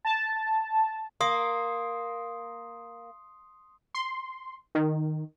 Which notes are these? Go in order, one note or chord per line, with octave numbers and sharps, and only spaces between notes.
A5
A#3 C6 D#6 C7
C6
D#3